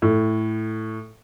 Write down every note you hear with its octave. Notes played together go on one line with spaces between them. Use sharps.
A2